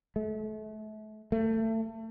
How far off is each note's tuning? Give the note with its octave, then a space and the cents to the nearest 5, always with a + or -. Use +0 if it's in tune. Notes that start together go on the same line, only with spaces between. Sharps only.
A3 -35
A3 +25